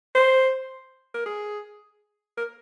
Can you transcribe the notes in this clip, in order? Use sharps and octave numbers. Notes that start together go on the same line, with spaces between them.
C5
A#4
G#4
A#4